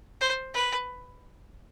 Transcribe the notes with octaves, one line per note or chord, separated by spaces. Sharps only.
C5
B4